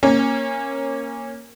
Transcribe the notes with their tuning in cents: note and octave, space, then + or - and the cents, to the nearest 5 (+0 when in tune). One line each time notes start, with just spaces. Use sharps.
A#3 +0 C#4 -20